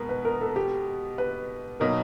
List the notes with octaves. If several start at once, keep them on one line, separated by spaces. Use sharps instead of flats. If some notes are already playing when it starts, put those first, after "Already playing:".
Already playing: B2 G#3 B3 A#4
B4
A#4
A4
G4
B4
B2 F#3 A#3 D#4 A#4